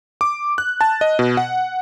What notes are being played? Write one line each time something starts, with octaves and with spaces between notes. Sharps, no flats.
D6
F#6
A5
D#5
B2
F#5